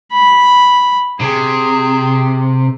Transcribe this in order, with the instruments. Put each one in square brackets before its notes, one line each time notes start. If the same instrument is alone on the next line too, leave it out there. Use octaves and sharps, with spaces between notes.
[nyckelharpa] B5
[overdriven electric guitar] C3 [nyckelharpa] G#4